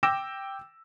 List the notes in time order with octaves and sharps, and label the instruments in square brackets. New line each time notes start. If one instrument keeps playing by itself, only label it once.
[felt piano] G5 D6 E6 A#6 E7